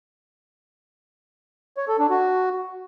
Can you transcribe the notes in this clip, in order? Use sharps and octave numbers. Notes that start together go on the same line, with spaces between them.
C#5
A4
D4
F#4